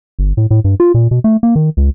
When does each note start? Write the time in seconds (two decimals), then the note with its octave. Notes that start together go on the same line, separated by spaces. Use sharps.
0.19 G1
0.37 A2
0.51 A2
0.64 G2
0.80 F4
0.94 A#2
1.11 B2
1.24 A3
1.43 A#3
1.56 D#3
1.77 C#2